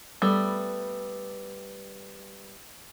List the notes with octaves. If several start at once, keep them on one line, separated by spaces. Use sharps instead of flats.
G3 A3 B3